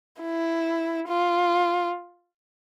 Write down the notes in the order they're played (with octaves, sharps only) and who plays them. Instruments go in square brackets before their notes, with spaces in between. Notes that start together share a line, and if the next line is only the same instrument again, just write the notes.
[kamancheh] E4
F4